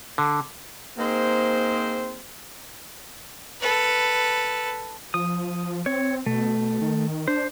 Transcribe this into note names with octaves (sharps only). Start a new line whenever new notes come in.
D3
A#3 C4 D#4 G#4 C5
A4 B4
F3 D#6
C4 C#5
B2 A3
D#3
D4 C5